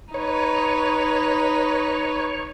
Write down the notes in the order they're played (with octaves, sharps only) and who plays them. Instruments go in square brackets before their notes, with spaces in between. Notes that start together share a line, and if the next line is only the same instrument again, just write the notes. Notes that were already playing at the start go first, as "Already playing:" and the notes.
[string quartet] D#4 B4 [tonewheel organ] C#5